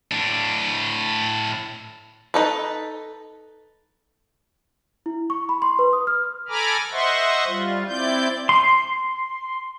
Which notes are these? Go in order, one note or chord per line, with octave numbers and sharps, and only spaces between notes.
A2 D4
D#4 A4 B4
E4
C#6
B5
C6
B4
D#6
F6
A4 G#5 A#5 B5 D6 F6
C5 D#5 E5 F#5 C6 C#6
G3 F4
C4 E4 D5 G6
C6